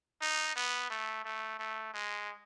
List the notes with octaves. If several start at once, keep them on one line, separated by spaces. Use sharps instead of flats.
D#4
B3
A3
A3
A3
G#3